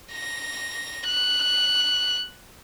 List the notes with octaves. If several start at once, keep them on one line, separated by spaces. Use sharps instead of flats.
A#6
F#6